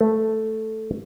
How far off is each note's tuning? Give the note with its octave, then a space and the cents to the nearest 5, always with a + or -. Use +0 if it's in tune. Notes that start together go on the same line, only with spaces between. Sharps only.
A3 +0